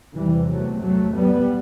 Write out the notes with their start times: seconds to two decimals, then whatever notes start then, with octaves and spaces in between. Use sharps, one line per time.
0.16 E2 C3 E3 G3
0.49 F#3 A3
0.82 F#3 A3
1.16 G3 B3